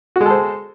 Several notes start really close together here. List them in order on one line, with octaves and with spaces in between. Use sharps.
F#4 G#3 A4 C5